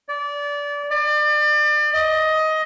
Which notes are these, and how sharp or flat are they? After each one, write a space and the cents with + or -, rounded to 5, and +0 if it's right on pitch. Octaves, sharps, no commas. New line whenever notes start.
D5 -25
D5 +35
D#5 +15